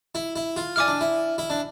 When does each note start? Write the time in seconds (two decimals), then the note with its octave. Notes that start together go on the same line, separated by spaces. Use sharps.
0.15 E4
0.36 E4
0.56 F4
0.76 E4 D5 G#5 D6 F6
0.88 D4
1.01 E4
1.38 E4
1.50 D4